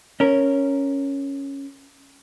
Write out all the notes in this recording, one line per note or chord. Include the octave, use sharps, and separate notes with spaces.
C#4 A#4